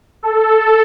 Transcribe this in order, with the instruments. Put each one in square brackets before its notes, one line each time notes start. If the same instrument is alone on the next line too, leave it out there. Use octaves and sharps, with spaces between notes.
[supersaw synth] A4